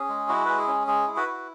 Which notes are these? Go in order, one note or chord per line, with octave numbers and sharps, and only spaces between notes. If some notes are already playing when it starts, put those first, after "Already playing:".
Already playing: C#4 G#4
G#3
E4 F#4
G#3 B4
G#4
C#4
G#3 G#4
E4
F#4 B4
E4